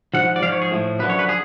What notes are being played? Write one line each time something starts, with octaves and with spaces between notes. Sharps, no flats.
G#2 F3 F#5
D5
G#2 F3 F5
C#5
G#4
A2 F3
F#2 D3 F3 B4
C#5
B4
G#4